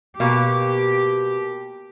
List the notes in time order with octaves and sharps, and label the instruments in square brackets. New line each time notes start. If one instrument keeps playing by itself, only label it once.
[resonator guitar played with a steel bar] B2 A#3 [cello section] G4